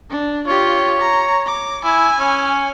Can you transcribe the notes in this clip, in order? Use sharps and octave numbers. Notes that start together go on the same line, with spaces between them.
D4
F4 G4 C#5
A#5
D6
E4 G#5
C#4